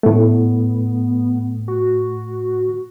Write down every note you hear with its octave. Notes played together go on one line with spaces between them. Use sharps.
A2 A3 B3
F#4